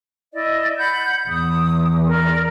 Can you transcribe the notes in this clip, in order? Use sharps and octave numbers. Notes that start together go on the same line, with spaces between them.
E4 D5 D#5
F#5 B5 G6
E2 D#6
A#4 D5 F6